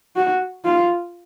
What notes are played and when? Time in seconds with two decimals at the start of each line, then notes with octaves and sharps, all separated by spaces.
0.16 F#4
0.65 F4